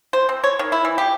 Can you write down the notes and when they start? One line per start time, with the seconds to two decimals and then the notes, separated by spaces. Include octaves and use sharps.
0.13 C5
0.29 C4
0.44 C#5
0.59 D#3
0.72 E4
0.85 E3
0.98 G4